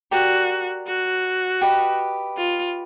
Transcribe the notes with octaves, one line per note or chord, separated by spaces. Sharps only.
F#4 G4 A#4 D5
F#4
G4 B4 D#5
F4